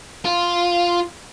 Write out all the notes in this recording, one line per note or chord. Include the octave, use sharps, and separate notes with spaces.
F4